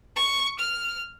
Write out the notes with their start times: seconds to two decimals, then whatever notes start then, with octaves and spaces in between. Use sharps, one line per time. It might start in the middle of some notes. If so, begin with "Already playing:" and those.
0.16 C#6
0.59 F6